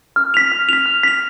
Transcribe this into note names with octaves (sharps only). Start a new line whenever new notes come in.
F6
B6 F7
F6
B6 F7
F6
B6 F7